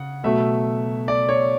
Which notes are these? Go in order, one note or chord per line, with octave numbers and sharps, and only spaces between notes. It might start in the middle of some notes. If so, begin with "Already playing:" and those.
Already playing: C#3 F#5
B2 F#3 A3 E5
D5
C#5